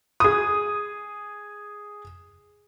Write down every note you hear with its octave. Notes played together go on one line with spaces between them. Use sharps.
G#4 D#6